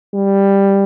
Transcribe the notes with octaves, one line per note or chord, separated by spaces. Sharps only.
G3